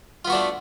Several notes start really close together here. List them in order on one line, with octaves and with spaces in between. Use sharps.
F4 B3 F#4 D4 A3